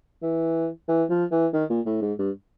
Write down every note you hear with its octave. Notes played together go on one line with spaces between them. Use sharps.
E3
E3
F3
E3
D#3
A#2
A2
G#2
G2